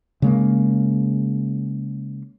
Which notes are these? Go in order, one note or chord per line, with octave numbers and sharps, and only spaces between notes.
C#3 G#3 A#3